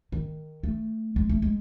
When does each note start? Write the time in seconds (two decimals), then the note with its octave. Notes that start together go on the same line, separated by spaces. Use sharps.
0.12 D#3
0.63 A3
1.16 G#3
1.29 A3
1.42 G#3